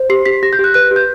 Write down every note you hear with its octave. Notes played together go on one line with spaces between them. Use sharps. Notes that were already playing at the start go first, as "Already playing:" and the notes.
Already playing: C5
G4 C7
G4 B6
G4 A#6
G6
G4
F#6
B4 F#6
G4
G6